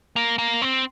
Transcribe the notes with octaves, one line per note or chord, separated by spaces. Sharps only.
A#3
A#3
C4